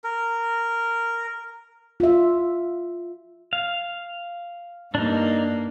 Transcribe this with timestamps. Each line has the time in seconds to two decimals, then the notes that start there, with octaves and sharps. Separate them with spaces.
0.04 A#4
2.00 F4 E5
3.53 F5
4.95 G2 A#3 D4 D#4